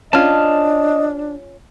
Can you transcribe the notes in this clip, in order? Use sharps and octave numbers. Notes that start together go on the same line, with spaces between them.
C#4 D4 F4 D#5 A5 F6